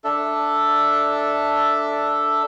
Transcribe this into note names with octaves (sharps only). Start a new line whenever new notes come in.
D4 A4 E5